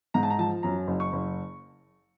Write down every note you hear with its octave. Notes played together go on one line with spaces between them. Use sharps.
G#2 A#5
A5
A#5
F3 A5
F#2 A#5
F#1
C#6
F#1